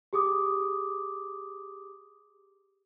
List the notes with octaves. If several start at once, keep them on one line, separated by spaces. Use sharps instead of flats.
G4 G#4 D6 D#6